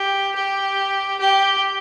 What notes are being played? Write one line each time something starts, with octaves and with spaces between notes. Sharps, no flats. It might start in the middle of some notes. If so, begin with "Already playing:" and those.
Already playing: G4
G4
G4